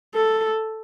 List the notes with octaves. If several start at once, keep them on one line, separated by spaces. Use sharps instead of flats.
A4